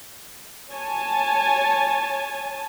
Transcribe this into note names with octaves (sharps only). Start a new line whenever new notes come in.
C#5 G#5 A5